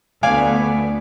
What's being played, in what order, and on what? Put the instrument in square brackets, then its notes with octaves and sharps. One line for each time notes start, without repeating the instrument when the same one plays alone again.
[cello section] D2 B3 [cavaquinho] D5 F5 G#5